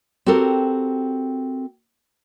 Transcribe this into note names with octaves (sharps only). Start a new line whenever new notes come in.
C4 F#4 G4 A4 A#4